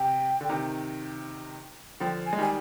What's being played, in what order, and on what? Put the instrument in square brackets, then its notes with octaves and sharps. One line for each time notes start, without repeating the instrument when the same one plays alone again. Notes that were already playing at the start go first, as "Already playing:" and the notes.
Already playing: [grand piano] C3 [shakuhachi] G5
[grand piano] D3
C3 D#3
[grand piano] D3 F3 [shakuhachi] G5
[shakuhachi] G#5
[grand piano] G#3
[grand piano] D#3 G3 [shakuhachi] G#5